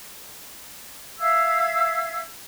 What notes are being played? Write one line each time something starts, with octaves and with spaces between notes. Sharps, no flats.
E5 F5 E6 G#6